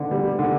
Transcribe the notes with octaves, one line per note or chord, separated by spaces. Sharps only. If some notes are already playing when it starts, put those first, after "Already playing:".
Already playing: D3
G3
D3